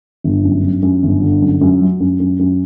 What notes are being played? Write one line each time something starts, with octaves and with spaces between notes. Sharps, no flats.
G1
F#2
F#2
F#2
G1
D3
F#2
F#2
F#3
F#2
F#2
F#2